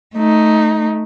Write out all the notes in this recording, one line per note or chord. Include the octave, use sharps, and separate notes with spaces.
A3 D#4